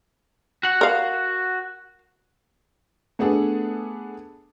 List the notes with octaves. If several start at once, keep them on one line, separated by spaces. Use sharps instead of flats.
F#4 F#5
A#4 F5
A3 B3 D4 G#4 A4